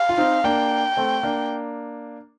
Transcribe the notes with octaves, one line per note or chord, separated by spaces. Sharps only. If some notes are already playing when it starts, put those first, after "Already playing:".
Already playing: F5
F4
C4 D#4
A#3 D4 G5
A3 C4
A#3 D4